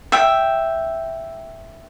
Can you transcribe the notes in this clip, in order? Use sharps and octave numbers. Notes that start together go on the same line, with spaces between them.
E5 G5